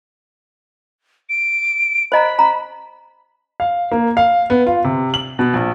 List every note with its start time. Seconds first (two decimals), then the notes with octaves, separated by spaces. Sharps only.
1.29 D7
2.12 C5 D#5 A#5 B5
2.39 A#5
3.60 F5
3.91 A#3
4.17 F5
4.50 B3
4.67 F4
4.84 C3
5.14 F#7
5.39 B2
5.54 A#1